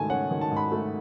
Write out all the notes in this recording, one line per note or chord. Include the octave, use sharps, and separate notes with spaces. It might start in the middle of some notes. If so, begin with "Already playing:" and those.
Already playing: G#2 D#3 A3 G#5 A5
C#4 F#5
D#3
A5
G#2
B5
A3